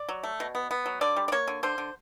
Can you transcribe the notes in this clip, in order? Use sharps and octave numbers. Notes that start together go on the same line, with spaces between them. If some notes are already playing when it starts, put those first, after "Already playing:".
Already playing: D5
F#3
A3
B2
B3
B3
F#3
D3 D5
G3
D5
A#3 C#5
D3
D3 C5
D3